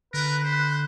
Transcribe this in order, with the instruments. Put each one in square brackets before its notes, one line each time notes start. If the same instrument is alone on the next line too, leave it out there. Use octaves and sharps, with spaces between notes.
[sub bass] D3 [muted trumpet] A#4 [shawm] B4 [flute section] F#6
[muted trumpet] C5 [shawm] B5